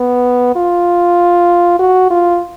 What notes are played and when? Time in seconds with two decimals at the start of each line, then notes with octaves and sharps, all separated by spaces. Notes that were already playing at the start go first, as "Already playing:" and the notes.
Already playing: B3
0.56 F4
1.79 F#4
2.10 F4